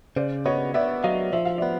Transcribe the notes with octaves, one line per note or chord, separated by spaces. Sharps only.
C#3 C5 D5
B3 C#5 D#5
B3 D5 E5
F#3 D#5 F5
F3 E5
F5
B3 D5 E5